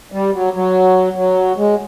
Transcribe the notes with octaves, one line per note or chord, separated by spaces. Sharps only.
G3
F#3
F#3
F#3
G#3